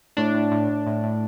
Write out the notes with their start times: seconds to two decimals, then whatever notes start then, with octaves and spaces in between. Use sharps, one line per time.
0.17 A2 D4
0.35 A2
0.51 A2
0.69 A2
0.87 A2
1.04 A2